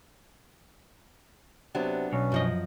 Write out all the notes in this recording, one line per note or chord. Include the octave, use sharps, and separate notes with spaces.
C3 F#3 B3 D4
B1 C#4
F#2 F3 D#5